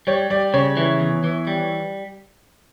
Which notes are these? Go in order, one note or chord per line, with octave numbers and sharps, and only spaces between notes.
G3 C#5
G3 D5
C#3 C#5
E3
E2
E3
G3